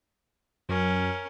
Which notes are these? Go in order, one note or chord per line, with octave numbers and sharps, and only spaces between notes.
F#2 C#4 A#4